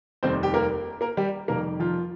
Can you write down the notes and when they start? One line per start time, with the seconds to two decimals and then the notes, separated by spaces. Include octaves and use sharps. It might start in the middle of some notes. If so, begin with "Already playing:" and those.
0.23 F1 D#2 D#3 G3 C4 C5
0.43 G4
0.54 A#3 A#4
1.01 A#3 A#4
1.17 G3 G4
1.48 F2 C3 D#3 G3 A#3 A#4
1.80 F3 F4